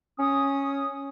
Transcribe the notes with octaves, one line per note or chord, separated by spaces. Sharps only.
C#4 D#6